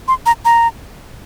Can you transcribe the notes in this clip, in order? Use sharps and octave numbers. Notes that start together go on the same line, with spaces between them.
C6
A#5
A#5